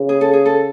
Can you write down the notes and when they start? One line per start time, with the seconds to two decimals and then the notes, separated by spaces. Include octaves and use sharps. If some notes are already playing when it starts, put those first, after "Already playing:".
Already playing: C#3
0.09 G#4
0.21 A4
0.33 G#4
0.45 A4